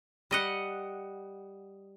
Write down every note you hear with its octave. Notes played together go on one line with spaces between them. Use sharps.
G3 D#5 F#5